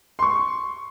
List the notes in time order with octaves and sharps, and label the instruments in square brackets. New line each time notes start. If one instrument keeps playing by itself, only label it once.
[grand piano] C6 C#6